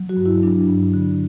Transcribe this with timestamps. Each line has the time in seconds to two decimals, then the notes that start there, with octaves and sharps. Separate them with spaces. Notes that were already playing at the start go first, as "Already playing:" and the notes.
Already playing: F#3
0.09 F#4
0.17 G2
0.26 E4
0.43 F#3 D4
0.68 G2
0.94 D3